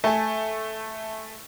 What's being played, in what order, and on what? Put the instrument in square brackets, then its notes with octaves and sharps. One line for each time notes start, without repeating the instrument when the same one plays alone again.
[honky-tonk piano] A3 [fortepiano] G#5 A5